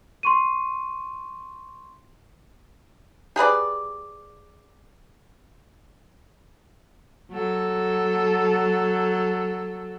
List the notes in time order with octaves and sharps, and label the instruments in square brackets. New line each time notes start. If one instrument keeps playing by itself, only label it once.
[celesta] C6 C#6 D#7
[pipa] G4 G#4 B4 D5
[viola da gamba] F#3 A4